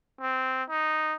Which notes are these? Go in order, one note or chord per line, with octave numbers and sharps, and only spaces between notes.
C4
D#4